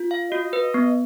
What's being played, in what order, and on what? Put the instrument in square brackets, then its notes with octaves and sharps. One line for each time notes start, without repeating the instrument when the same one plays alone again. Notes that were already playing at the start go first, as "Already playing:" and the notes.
Already playing: [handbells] F4
F5
[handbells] F#4 [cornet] D#5
[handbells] B4
B3